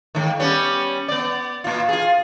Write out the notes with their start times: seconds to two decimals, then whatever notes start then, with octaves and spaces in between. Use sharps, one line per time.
0.15 G#2 D#3
0.40 G3 B3 C#4
1.08 B3 D5
1.64 A#2 F4
1.89 F4 G#4